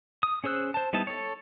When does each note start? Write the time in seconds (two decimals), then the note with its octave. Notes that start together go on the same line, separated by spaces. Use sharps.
0.23 D#6
0.44 C#4 G#4 C5 E6 F#6
0.74 C5 A5
0.93 G3 B3 D#4 E4 A5
1.07 A4 C#5